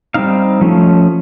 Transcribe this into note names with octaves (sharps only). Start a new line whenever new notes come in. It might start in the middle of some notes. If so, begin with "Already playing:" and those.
G3 C4 D#4 F5
F3 A3 C#4